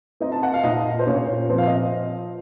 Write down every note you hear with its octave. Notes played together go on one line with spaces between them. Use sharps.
C4 D#4 D#5
A5
F#5
F5
A#2 D#4 D#5
C5
A#2 C#4 C#5
F3 C4 C5
F5
D#5